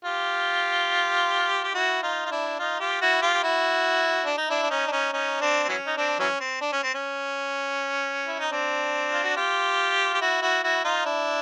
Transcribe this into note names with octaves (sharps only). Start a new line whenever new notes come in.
F4 G4
G4
E4 F#4
D#4 F4
F4
D4 E4
D#4 F4
F4 G4
E4 F#4
F4 G4
G4
E4 F#4
D4
D#4
D4 E4
D4
C#4 D#4
D4
C#4 D#4
C#4 D#4
C4 D4
C4
E3 F#3 C#4
D#4
C4 D4
E3 F#3 C#4
C4
D4
C#4
C4
C#4
E4
D#4
C4 D4
F4
F#4
F4 G4
G4
E4 F#4
E4 F#4
E4 F#4
D#4 F4
D4 E4